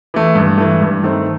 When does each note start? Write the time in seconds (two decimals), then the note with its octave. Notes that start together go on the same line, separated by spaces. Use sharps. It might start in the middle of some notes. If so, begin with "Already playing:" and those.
0.14 E3 A3
0.35 G2
0.58 E3 A3
0.81 G2
1.03 D#3 A3 C4